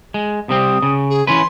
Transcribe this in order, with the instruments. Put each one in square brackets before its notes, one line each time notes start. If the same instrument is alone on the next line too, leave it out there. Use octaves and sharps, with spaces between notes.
[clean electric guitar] G#3
[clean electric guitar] C3 G3 C4 [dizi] D#6
[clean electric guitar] C#3
[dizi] G#4
[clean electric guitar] E3 C#4 B4 [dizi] C6